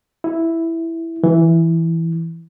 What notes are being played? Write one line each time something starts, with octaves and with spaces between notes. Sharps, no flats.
E4
E3